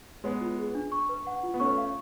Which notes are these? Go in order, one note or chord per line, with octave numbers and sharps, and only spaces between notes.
G#3 B3 C#5
F4
G#4
D4
C#6
B4
F#5
F4
B3
A3 C#4 C#6
F5